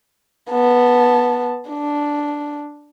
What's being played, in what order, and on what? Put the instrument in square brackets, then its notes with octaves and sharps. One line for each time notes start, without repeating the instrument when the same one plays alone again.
[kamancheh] B3 A5
D4